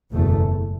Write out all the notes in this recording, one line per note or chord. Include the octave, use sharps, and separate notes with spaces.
F#1 E2 B2 A3